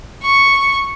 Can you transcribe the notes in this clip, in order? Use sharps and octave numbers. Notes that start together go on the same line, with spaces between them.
C#6